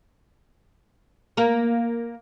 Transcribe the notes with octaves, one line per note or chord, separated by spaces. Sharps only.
A#3 A#4